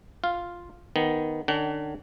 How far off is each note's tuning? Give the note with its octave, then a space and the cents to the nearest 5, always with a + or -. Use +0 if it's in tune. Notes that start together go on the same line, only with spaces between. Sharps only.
F4 +0 F5 +0
D#3 +0 B3 +0
D3 +45 D4 -45 F#5 +45